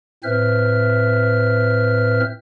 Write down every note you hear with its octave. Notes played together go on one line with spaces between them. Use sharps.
A2 C4 B4 C5 E5 F6